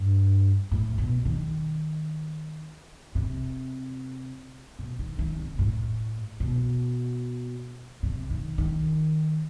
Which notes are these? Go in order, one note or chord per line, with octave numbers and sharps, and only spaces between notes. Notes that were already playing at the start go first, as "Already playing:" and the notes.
Already playing: G2
A2
B2
D#3
C3
B2
D#3
D#3
C3
A2
B2
C3
D#3
D#3